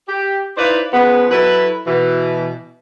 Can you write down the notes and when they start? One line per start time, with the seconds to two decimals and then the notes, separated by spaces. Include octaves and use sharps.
0.08 G4
0.57 D#4 E4 B4 C5 D5 F5
0.93 C#3 F3 G#3 B3
1.30 F#3 E4 A4 B4
1.87 B2 E3